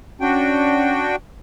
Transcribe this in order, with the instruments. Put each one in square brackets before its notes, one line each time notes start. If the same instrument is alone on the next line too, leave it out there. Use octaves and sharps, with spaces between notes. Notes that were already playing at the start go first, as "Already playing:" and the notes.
[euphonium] C#4 [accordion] D4 F#4 G5